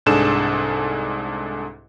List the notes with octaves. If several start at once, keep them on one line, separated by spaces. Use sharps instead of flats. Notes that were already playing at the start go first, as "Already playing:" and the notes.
C2 G#2 D4 G#4 A4 E7